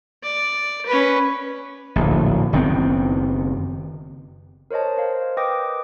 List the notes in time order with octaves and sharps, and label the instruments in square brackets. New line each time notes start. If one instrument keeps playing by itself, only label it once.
[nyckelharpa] D5
C#4 B4
[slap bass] D1 A#1
F#1 D#3 B3 C4
[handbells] A#4 C5 C#5 D#5 A5
A#4 C5 F5
B4 D#5 G5 D6 D#6 A#6